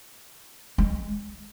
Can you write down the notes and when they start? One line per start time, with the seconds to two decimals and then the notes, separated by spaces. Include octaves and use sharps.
0.78 G#3